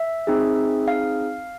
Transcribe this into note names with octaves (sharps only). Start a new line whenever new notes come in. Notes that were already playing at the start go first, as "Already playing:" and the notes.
Already playing: E5
C4 D#4 G#4
F5